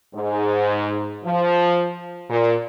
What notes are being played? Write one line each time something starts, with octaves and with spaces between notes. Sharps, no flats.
G#2
F3
A#2